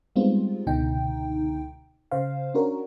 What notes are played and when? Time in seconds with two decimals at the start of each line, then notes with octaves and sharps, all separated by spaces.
0.16 G3 G#3 B3 C4 D#4 F4
0.67 C#2 B2 D3 D#4 G5
2.11 C#3 C5 F5
2.54 C#4 D4 F#4 A#4 C#5